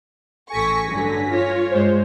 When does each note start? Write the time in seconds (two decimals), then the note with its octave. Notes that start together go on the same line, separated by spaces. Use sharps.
0.50 A1 A4 G#5 C#6 A#6 B6
0.89 G2 D3 F#3
1.30 F4 C#5
1.71 G2 G#3 C5